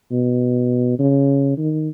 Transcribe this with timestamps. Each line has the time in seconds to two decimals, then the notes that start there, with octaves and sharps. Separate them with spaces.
0.11 B2
0.99 C#3
1.58 D#3